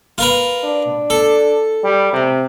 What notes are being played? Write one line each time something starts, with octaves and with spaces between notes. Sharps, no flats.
F4 A#4 B4
D4
A4
G3
C3